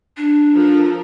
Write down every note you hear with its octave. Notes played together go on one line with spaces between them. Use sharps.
D4
F3 A4 A#4